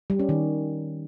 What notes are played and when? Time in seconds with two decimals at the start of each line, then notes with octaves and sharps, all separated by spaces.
0.10 G3
0.19 C#4
0.29 D#3